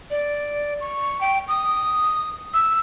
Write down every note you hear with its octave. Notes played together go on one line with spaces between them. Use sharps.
D5
C#6
G5
D#6
E6